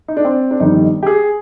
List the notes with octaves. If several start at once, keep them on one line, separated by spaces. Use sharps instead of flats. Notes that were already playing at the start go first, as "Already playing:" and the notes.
D#4
D4
C4
D4
G1 F2 D#3 G3 D#4
G4
G#4